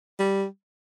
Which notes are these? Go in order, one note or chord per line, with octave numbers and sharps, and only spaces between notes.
G3